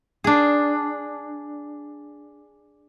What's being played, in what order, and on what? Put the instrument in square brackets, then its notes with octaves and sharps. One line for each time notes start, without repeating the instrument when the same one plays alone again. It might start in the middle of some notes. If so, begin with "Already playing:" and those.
[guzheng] D4 G#4